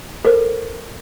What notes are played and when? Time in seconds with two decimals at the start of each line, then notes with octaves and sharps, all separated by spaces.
0.25 A4 A#4 C5